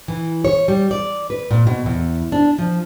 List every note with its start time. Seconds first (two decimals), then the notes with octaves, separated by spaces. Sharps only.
0.08 E3
0.45 C#5
0.68 G3
0.91 D5
1.30 B4
1.51 A#2
1.67 B2
1.86 E2
2.32 D4
2.58 F3